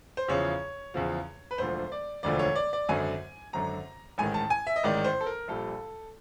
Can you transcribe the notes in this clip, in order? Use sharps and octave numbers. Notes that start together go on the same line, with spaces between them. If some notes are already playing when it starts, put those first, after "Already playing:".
C5
E2 C#3 F3 C#5
E2 C#3 F3
B4
E1 D2 D3 F3 C5
D5
E1 D2 D3 F3 D5
C#5
D5
D5
G#1 F#2 D3 F#3 G#5
G#1 F#2 D3 F#3 A#5
A1 G#2 D#3 G#5
A5
G#5
E5
D#5
A1 G#2 D#3 D5
C5
A4
A#4
A#1 A#2 G3 A4